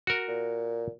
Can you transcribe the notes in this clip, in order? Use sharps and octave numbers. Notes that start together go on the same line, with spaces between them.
F#4 A#4
A#2